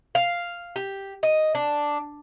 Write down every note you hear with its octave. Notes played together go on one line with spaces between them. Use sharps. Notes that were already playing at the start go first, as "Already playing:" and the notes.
F5
G4
D#5
D4